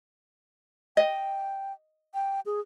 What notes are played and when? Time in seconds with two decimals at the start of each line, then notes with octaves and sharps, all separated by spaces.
0.97 D#5 G5
2.14 G5
2.46 G#4